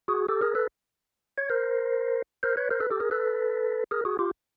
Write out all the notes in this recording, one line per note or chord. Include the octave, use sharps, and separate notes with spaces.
F#4 G#4
G4 A4
G#4 A#4
A4 B4
C#5
A#4 C5
A#4 C5
B4 C#5
A#4 C5
A4 B4
G4 A4
G#4 A#4
A4 B4
G#4 A#4
F#4 G#4
F4 G4